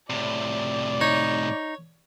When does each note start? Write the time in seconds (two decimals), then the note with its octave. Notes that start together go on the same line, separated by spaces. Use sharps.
0.10 A2 C3 D5
1.01 D#4 C#5